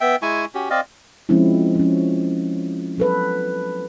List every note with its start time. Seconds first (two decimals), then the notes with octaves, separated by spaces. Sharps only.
0.01 B3 E5 G5
0.22 G#3 E4 G#5 C#6
0.54 C#4 F#4 G4
0.70 C4 D5 D#5 F5
1.29 F3 G#3 C4 C#4 E4
1.75 F3 C#4
2.98 F#3 A4 B4